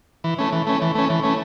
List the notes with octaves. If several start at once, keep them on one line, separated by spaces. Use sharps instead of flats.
E3
A3 C#4
E3
A3 C#4
E3
A3 C#4
E3
A3 C#4